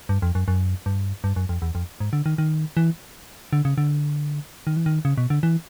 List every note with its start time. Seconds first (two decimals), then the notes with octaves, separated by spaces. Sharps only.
0.09 G2
0.22 F2
0.35 F#2
0.48 F#2
0.86 G2
1.24 G2
1.36 F#2
1.49 F2
1.62 E2
1.75 F2
2.00 G#2
2.13 D3
2.26 D#3
2.38 D#3
2.77 E3
3.53 D3
3.65 C#3
3.78 D3
4.67 D#3
4.76 E3
4.86 D#3
5.05 C#3
5.18 B2
5.30 D3
5.43 E3